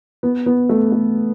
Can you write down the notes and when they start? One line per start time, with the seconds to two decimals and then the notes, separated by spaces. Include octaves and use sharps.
0.23 B3
0.46 B3
0.69 A3
0.92 A3